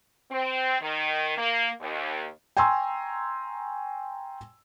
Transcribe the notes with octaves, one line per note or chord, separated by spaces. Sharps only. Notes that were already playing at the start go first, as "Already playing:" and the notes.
C4
D#3
A#3
D#2
G5 G#5 A#5 C6 C#6 E6